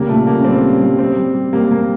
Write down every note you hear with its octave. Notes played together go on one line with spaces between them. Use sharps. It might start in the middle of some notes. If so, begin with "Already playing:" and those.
Already playing: C#3 G3 A#3
A#2 A3
A#2 A#3
C#4
G3 C4
G3
G3
G3 C4
G3
G3
G3 A#3
G3 A#3